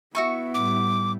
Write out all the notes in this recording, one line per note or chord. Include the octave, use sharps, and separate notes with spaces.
B3 E4 F#4 E5 C#6
A2 G3 D6